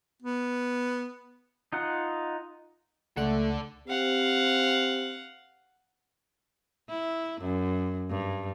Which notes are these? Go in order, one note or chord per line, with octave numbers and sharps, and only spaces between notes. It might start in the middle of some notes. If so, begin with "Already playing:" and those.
B3
D#4 F4 F#5
C#2 A3 A4 D5 F#5
C4 G4 F5 F#5
E4
F#2
G2